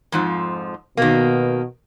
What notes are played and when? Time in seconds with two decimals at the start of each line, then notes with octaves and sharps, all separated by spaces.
0.12 F2 G#2 F3
0.97 B2 D#3 A#3